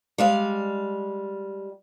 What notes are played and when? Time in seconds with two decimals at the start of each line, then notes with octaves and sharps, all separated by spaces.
0.18 G3 G#3 F5